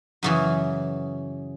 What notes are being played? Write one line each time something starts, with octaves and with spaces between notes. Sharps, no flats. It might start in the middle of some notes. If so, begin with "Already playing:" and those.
F#2 C#3 E3